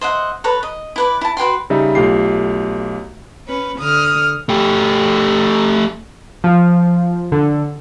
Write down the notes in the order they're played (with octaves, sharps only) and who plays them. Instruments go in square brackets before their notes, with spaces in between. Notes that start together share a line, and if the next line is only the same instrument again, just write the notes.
[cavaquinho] C5 D#5 E5 F#5
A4 B4 C#5 A#5
D#5
E4 B4 D5
E4 A5
F#4 B4 G5 C6
[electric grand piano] C#3 G3 D#4 E5
B1 A3 F4 G4 C7
[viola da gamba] C#4 [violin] B4
[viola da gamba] D3 [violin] D#6 F6
[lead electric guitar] A3 G4
[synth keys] F3
D3